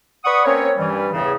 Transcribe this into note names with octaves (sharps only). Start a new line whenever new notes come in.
B4 D5 F#5 B5 C#6 D#6
A#3 C4 C#4 C#5
G2 E3 G3
E2 A2 C#3